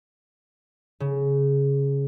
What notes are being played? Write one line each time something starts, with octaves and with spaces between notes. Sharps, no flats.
C#3